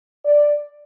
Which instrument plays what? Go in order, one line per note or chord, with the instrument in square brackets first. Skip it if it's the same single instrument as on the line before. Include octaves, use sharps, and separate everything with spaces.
[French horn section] D5